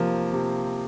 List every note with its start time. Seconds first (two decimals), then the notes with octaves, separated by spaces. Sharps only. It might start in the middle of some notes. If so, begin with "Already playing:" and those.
Already playing: C3 F3 A#3
0.33 C3